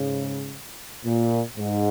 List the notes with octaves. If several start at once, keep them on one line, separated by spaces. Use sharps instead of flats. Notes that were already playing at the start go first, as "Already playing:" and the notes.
Already playing: G#2 C#3
A#2
G#2